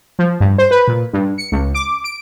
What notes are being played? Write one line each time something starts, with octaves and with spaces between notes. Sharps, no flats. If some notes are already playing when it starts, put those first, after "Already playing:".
F3
G2
C5
B4
A#2
G2
C#7
C#2
D6
D7